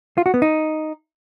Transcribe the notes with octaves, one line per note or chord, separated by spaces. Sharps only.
F4
F#4
B3
D#4